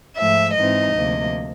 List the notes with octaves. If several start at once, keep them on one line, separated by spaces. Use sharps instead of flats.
G#2 F3 A3 E5
G#2 E3 G#3 C4 D#4 D#5
D2 C3 F3 A#3